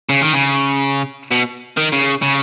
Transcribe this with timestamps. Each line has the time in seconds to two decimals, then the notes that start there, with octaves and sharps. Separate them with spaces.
0.09 C#3
0.22 D#3
0.33 C#3
1.31 B2
1.77 D#3
1.93 C#3
2.22 C#3